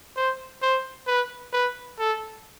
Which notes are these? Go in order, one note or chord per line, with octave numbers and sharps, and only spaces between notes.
C5
C5
B4
B4
A4